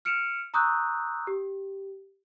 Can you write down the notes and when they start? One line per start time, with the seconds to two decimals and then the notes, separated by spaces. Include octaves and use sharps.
0.05 F6 C#7 D7 E7 F7
0.54 A#5 C#6 D#6 E6 F#6 G6
1.27 G4